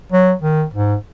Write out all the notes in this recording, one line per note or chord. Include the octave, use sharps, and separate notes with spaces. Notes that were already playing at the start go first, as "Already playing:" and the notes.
F#3
D#3
G#2